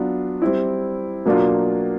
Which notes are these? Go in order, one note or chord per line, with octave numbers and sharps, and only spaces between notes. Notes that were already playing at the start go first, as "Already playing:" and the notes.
Already playing: F#3 B3 D4 F4
G3 C4 E4
B2 F#3 A#3 D4 F4